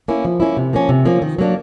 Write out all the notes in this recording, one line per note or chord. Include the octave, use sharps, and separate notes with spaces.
A#3 C#4 E4
F3
A#3 C#4 E4
C3
F3 A#3 C#4
C3
F3 A#3 C#4
D#3
F#3 A#3 D4